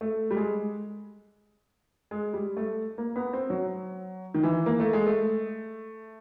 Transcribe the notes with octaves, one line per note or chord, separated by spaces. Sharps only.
A3
G3
G#3
G#3
G3
A3
A#3
B3
C4
F#3
D#3
E3
A#3
A3
G#3
A3